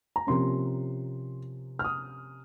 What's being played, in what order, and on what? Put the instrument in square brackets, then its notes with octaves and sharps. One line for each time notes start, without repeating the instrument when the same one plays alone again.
[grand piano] A#5
C3 F3 A#3 C#4 C6
F6
D#6